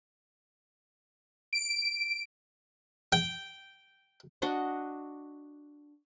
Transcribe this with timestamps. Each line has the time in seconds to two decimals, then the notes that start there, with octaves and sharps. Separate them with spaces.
1.53 D7
3.13 G5
4.42 D4 F#4 D#5 F#5